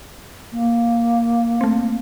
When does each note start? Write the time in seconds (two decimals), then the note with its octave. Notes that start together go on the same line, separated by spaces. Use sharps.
0.52 A#3
1.61 A3 C4